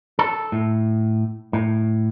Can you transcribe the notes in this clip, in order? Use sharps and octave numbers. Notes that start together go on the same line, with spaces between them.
A4
A2
A2